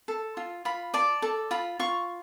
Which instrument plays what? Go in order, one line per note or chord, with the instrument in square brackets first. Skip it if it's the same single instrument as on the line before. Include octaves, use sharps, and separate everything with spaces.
[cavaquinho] A4
F4
F4 B5
D5 A5
A4
F4 B5
F4 C#6